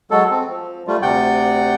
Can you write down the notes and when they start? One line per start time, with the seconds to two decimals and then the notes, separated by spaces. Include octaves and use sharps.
0.11 F#3 G#3 A4
0.31 C4
0.49 F3
0.88 G3 A3 F4
1.02 D2 C3 D5 F#5 G5 G6